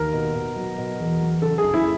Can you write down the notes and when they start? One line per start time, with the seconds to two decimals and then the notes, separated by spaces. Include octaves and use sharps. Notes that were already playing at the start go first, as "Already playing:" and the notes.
Already playing: D#2 A#4
0.13 B2
0.35 B2
0.56 F#3
0.78 B2
0.99 E2
1.20 F#3
1.42 C#3 A4
1.58 G#4
1.63 F#1
1.74 E4